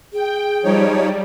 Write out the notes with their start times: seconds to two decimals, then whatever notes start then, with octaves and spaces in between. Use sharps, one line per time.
0.13 G#4 G5
0.64 F3 G3 D#4 C#5